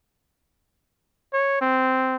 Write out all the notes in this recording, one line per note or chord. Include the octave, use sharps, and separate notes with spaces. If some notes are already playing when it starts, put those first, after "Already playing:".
C#5
C4